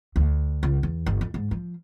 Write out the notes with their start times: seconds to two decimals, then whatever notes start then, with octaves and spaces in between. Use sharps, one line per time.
0.16 D2
0.63 C#2
0.83 E2
1.06 G1
1.21 F2
1.34 G#2
1.51 F3